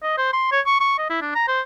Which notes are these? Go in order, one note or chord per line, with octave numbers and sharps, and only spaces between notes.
D#5
C5
C6
C#5
C#6
C#6
D#5
E4
D4
A#5
C5